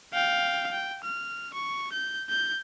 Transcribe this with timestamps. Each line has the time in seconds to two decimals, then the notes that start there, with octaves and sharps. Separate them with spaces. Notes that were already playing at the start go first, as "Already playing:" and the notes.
0.13 F5 G5
0.71 G5
1.04 F6
1.54 C#6
1.92 G6
2.30 G6